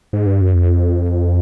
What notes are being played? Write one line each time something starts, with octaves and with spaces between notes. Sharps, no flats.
G#2
G2
F#2
F2